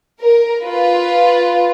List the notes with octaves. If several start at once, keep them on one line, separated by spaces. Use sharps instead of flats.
A#4
F4 B4